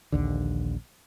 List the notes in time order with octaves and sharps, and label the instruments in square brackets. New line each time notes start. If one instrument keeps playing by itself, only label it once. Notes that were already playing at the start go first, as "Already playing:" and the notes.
[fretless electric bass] A#1 D#2 D3